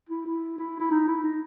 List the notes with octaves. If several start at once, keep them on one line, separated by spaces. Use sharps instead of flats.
E4
E4
E4
E4
D#4
E4
D#4